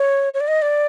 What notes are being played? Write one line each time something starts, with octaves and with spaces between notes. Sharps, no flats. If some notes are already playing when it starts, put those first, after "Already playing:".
Already playing: C#5
C#5
D5
D#5
D5